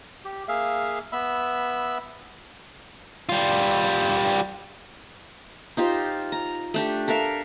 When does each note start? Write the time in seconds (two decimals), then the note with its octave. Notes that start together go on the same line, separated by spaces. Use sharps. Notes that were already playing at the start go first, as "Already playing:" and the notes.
0.25 G4
0.48 A#3 G#4 E5 F5
1.12 B3 E5 B5 E6
3.29 G3 F4
5.77 D#4 F4 G4 C5
6.32 A#5
6.74 A3 D4 G4
7.08 A4 A#4 E5 F5